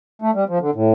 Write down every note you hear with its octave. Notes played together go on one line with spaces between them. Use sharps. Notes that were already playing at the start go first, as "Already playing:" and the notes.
A3
G3
F3
D3
A2